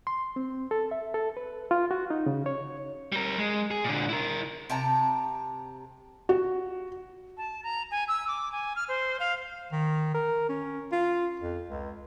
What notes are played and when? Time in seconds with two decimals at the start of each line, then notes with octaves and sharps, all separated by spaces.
0.07 C6
0.36 C4
0.71 A4
0.91 E5
1.14 A4
1.37 B4
1.71 F4
1.91 F#4
2.10 D#4
2.26 C#3
2.46 C#5
3.12 G3 A#4
3.38 G#3
3.71 G#4
3.84 A#2 D3
4.09 E4 A#4
4.70 C3 G5 A5 A#5
6.29 F#4
7.37 A5
7.64 A#5
7.91 G#5
8.08 E6
8.28 D6
8.52 G#5
8.76 F6
8.88 C5
9.20 F5
9.72 D#3
10.14 A#4
10.49 C#4
10.92 F4
11.40 F2
11.68 C#2